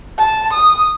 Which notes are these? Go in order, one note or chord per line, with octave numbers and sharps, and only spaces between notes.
A5
D#6